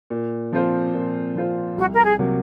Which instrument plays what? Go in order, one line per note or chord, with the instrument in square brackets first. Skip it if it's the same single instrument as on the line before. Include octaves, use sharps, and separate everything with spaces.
[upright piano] A#2
F3 C4 F4 C5
A#2
F3 C4 F4 C5
[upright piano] C2 [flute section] F#4
[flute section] A#4
G#4
[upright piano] C3 F#3 A#3